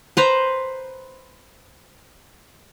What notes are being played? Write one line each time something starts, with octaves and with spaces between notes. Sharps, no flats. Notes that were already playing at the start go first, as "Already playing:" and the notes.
B4 C5 A#5